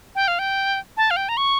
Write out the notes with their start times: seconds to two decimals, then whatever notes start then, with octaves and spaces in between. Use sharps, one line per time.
0.15 G5
0.28 F5
0.39 G5
0.97 A5
1.11 F5
1.17 G5
1.29 A#5
1.37 C#6